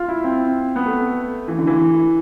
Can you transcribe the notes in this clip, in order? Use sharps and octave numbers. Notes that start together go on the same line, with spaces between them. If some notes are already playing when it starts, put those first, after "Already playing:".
Already playing: F4
E4
C4
B3
A3
E3
D3
E3